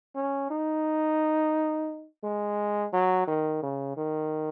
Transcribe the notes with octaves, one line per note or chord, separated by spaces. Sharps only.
C#4
D#4
G#3
F#3
D#3
C#3
D#3